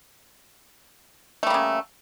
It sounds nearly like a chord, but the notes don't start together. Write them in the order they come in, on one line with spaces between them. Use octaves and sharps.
A3 G3 A#3 C#3